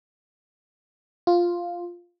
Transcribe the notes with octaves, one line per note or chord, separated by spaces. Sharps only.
F4